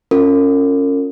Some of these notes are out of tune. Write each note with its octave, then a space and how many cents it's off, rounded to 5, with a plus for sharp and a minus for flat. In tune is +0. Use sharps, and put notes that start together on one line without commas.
C#4 +0 F4 +0 A#4 -40